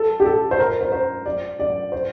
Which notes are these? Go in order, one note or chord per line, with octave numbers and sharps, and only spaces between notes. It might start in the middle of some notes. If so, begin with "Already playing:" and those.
Already playing: A4
G4
A4
C5
A#4
C5
C5
D5
D5
C5